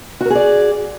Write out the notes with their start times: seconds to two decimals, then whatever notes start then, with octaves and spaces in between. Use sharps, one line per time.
0.21 F#4
0.26 A#4
0.30 G#4
0.35 D5